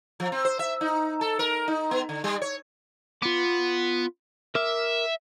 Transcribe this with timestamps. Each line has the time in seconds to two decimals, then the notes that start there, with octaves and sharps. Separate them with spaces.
0.20 F3
0.32 C4
0.45 C5
0.59 E5
0.81 D#4
1.21 A4
1.39 A#4
1.68 D#4
1.91 B3
2.09 D3
2.24 G3
2.42 C#5
3.22 B3 F4 D6
4.55 A#4 E5 D6 F6